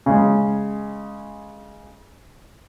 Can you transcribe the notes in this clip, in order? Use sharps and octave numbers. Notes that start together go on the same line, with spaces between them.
C#3 G#3